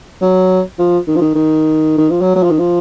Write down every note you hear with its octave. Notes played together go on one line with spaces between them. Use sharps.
F#3
F3
D#3
F3
D#3
D#3
D#3
F3
F#3
F#3
F3
D#3
F3